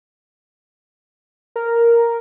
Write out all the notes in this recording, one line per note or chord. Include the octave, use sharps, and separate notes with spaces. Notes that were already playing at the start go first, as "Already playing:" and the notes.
A#4